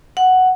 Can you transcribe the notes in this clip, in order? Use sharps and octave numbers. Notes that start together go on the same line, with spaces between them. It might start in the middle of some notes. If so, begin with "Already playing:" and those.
F#5